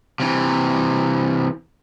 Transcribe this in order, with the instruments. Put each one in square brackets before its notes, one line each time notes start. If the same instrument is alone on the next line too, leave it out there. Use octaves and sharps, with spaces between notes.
[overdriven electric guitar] C3 E3